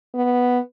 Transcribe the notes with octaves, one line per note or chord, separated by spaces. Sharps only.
B3